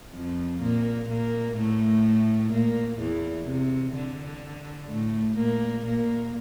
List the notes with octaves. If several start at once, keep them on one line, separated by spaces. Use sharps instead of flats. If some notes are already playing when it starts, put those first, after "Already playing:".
F2 F3
A#2 A#3
A#2 A#3
A2 A3
A#2 A#3
E2 E3
C3
D3
A2 A3
A#2 A#3
A#2 A#3